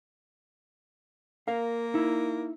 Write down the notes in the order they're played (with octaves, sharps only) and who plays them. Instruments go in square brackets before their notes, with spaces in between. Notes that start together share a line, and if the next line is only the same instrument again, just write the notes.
[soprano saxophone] A#3 [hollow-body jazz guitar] A#4 F5
[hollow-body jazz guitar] D#4 E4